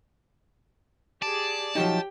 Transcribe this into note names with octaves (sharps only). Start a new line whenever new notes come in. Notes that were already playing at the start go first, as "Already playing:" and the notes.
G4 G#4 D5 A5
F3 F#3 D#4 G4 G5